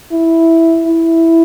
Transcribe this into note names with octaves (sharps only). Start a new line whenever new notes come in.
E4
E4